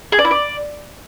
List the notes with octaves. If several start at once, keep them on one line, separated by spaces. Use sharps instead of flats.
G#4
D5
E4
D5